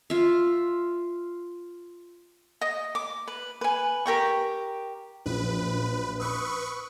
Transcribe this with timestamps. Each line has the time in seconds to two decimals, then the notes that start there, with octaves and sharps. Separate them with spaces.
0.10 F4 E5
2.61 D#5
2.95 D6
3.27 B4
3.61 B4 G#5
4.06 G4 A#4 G5 C#6
5.26 A#1 F#2 F3 B4
6.20 B4 C#6 D#6 E6 F#6